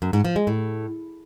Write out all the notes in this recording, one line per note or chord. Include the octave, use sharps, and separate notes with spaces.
F#2
G#2
F3
G#3
A2